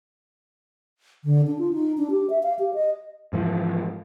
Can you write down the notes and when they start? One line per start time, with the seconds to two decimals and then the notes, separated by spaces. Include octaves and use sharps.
1.24 D3
1.47 D4
1.59 F4
1.73 D#4
1.98 D4
2.11 G4
2.30 E5
2.43 F5
2.59 G4
2.74 D#5
3.33 G#2 E3 F3